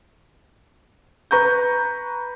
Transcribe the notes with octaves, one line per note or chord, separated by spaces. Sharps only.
B4 A#5 C#6 G6